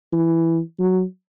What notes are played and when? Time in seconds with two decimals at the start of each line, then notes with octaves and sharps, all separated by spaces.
0.12 E3
0.79 F#3